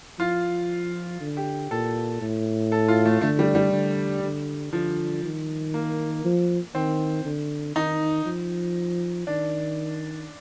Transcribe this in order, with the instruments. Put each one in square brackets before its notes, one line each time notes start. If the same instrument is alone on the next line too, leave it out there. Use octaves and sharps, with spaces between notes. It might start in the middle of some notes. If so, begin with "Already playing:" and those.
[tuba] F3 [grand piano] F4
[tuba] D3
[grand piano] G4
[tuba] A#2 [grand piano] A4
[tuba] A2
[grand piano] A4
F4
A3
[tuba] D3 [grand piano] A3
[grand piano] G3
G3
[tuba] D3
D3
[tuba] D3 [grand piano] F3
[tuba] D#3
[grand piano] A#3
[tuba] F3
[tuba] D#3 [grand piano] C4
[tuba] D3
[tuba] D#3 [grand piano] D#4
[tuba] F3
[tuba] D#3 [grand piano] D4